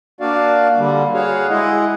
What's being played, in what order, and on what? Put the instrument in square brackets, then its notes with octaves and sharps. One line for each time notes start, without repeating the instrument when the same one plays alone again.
[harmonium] A#3 D4 F#4 D5 F5
D3 G3 A#3
F#4 G#4 C#5 F5 F#5
G#3 E4 G#4 D#5 F#5